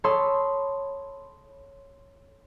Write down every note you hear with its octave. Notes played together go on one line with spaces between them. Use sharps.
A4 C#5 B5 C6 D#6 E6